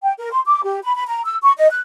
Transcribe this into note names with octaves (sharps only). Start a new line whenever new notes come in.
G5
A#4
C6
D6
G4
B5
B5
A#5
E6
C#6
D#5
F#6